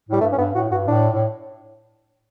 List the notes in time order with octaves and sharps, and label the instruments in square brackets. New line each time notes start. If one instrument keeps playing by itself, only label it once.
[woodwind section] A2 [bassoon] G3
[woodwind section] G2 [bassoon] A3
[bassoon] C#4
[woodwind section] G2 [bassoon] B3
[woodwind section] A2 [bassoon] F#4
[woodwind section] G2 [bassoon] F#4
[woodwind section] A2 [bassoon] D4
[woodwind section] A2